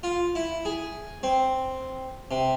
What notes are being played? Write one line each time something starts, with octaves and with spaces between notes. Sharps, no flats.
F4
E4
G#4
C4
C3